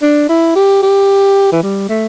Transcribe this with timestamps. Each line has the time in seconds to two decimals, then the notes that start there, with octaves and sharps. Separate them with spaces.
0.02 D4
0.29 E4
0.56 G4
0.83 G4
1.52 E3
1.63 G3
1.89 A3